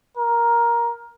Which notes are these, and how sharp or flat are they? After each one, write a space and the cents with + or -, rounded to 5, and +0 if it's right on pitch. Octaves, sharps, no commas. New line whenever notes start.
A#4 +10